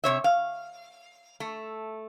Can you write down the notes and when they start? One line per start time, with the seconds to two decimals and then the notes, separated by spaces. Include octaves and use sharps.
0.04 C3 C#5 E5
0.24 F5
1.40 A3